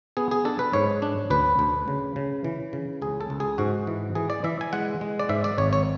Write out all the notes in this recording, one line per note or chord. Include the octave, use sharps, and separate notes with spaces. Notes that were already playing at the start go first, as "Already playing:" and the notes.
B3 G#4
G#4
D4 A4
B4
G#2 C#5
D4
D2 B4
D2
C#3
C#3
E3
C#3
C#2 G#4
A4
C#2
G#4
G#2 F#4
E3
E3 G#4
D5
E3 E5
G#5
G#3 F#5
G#3
D5
G#2 E5
D5
G#1 C#5
C#5